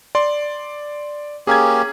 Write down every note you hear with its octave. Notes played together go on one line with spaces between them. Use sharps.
D5 C6
A#3 C#4 G4 G#4 G#6